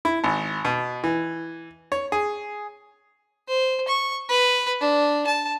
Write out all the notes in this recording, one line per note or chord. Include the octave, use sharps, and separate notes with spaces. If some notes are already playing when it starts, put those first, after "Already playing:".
E4
G#1
B2
E3
C#5
G#4
C5
C#6
B4
D4
A5